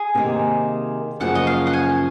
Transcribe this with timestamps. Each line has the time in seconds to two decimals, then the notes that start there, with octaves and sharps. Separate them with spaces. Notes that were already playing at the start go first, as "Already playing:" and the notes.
Already playing: G#4
0.15 C3 D#3 A#3 D#4
1.20 F#2 C#3 F3 A#3 F#5
1.35 D#5
1.47 F5
1.67 F#5
1.73 G#5